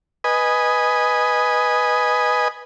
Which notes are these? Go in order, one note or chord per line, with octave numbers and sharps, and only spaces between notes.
B4 D#5 G#5